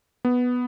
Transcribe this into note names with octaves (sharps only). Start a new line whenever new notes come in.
B3